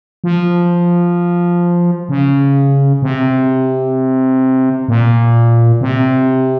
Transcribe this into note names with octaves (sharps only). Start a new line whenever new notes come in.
F3
C#3
C3
A#2
C3